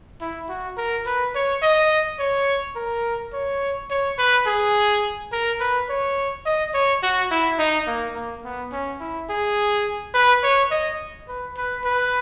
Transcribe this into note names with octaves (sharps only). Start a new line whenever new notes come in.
E4
F#4
A#4
B4
C#5
D#5
C#5
A#4
C#5
C#5
B4
G#4
A#4
B4
C#5
D#5
C#5
F#4
E4
D#4
A#3
A#3
B3
C#4
E4
G#4
B4
C#5
D#5
B4
B4
B4